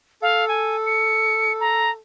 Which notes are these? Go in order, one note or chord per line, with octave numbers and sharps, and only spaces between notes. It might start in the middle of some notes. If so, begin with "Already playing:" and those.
A4 F5
G#5
C#7
A#5